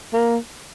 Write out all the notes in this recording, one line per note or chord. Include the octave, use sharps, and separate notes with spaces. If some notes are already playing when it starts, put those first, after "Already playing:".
A#3